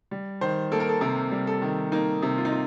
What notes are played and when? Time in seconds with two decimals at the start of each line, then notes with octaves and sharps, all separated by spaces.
0.11 G3
0.41 D#3 C5
0.72 A#3 A4
0.80 A#4
0.89 A4
1.01 C3 A#4
1.31 G3
1.47 A4
1.62 D#3
1.92 A#3 D#4
2.22 C3
2.38 F4
2.45 D#4
2.52 F4